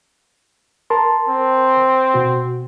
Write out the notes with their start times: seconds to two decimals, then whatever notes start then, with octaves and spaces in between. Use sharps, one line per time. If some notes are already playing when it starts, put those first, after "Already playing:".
0.90 A#4 A5 C6
1.29 C4
2.14 B2 F#4